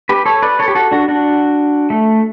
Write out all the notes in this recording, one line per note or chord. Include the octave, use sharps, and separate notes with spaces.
G4 B4
A4 C#5
B4 D5
A4 C#5
G4
F#4 A4
D4 F#4
D4 F#4
A3